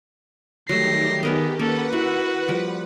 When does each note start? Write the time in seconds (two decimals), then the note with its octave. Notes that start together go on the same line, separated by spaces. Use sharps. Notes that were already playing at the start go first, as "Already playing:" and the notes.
0.69 D#3 F#3 G3 A3 G4 A#6 C7
1.23 B3 G#4 A#4 D#5
1.59 A#3 C#4 A4 B4 F#5
1.93 E4 F#4
2.48 F3 G3